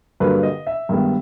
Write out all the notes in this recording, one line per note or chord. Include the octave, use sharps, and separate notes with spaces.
G2 D3 F#3 A#3 B4
D#5
E5
G2 D#3 G#3 B3